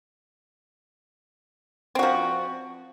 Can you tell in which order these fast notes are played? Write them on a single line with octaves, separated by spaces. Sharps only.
C4 F#4 F3